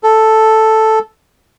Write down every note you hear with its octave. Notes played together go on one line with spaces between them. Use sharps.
A4